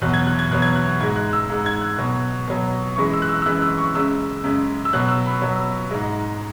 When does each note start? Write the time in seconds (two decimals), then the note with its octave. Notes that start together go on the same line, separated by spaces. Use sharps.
0.01 E2 B2 F#3 F#6
0.14 G#6
0.27 F#6
0.39 G#6
0.51 E2 B2 F#3 F#6
0.62 G#6
0.75 F#6
1.00 G#2 G#3 G#6
1.16 F#6
1.33 E6
1.49 G#2 G#3
1.66 G#6
1.81 F#6
1.98 B2 F#3
2.47 B2 F#3
2.96 F#2 E3 G#3 C#6
3.14 E6
3.22 F#6
3.29 E6
3.42 E6
3.45 F#2 E3 G#3 F#6
3.62 E6
3.78 C#6
3.95 F#2 C#3 G#3 E6
4.44 F#2 C#3 G#3
4.85 E6
4.93 B2 F#3 F#6
5.09 E6
5.26 B5
5.42 B2 F#3
5.91 G#2 G#3